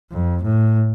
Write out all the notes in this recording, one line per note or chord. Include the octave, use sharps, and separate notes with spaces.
F2
A2